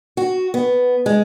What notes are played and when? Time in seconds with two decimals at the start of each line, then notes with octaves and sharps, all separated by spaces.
0.17 F#4
0.54 B3
1.06 G#3